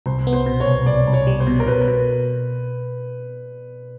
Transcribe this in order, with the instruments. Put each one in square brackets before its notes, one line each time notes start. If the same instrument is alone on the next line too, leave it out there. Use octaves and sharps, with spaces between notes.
[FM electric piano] C2 [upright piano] C5
[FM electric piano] B3
[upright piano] C5
[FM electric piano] B2
[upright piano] C#5
[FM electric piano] C2
[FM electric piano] C2 [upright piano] D5
[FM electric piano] C2
[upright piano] C#5
[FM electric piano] G3
[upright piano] C5
[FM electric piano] B2
[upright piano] A#4
[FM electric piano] B2 [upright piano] B4
[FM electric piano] B2